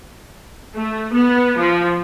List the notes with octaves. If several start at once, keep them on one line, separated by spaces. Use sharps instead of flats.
A3
B3
F3